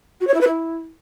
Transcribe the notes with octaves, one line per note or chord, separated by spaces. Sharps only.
F#4
C#5
E4
B4
E4